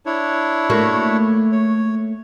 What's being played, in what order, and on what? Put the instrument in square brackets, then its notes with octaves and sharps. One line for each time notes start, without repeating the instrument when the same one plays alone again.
[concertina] D4 E4 C#5
[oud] A3 A#3 F#4
[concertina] C#5